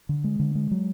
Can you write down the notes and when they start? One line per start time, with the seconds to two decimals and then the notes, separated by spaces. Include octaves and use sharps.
0.09 D3
0.24 G#3
0.39 D3
0.55 G#3
0.71 F#3